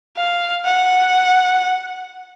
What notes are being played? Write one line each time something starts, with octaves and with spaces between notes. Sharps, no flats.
F5
F#5